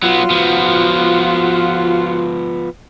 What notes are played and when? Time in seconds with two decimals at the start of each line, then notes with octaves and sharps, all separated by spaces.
0.03 F#3 B3 F4 F#4
0.30 F3 B3